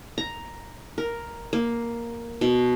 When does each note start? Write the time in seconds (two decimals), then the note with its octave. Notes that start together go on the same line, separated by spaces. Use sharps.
0.18 A#5
0.98 A#4
1.53 A#3
2.41 B2